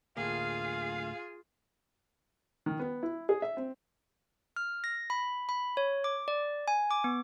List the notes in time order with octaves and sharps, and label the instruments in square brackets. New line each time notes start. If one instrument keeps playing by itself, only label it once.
[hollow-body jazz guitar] D2 A2 A#3 [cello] F4 G#4 [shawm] F5
[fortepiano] D#3
B3
E4
G#4
E5
C4
[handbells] F6
A#6
B5
B5
C#5
D6
D5
G#5
D6
B3